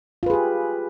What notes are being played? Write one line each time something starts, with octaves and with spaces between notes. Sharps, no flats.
F4 G4 G#4 B4